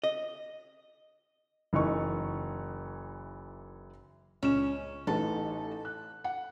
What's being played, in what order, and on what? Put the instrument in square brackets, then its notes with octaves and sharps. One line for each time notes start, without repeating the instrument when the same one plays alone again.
[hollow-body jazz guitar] D#5
[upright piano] F#1 E3 D#4 A#4 C#6
[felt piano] C#2 E7 [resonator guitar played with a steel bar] C#4
[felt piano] A1 D#4 B4 [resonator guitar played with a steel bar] A4
[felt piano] F#6
F#5